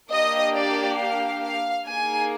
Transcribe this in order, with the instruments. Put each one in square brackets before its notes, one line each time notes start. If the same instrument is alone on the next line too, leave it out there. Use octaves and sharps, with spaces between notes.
[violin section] A#3 D4 G4 D#5
D5
F5
F5
A#3 D#4 G#4 G#5